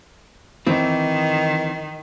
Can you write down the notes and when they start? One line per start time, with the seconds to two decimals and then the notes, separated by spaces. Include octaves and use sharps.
0.67 D#3 E3 C4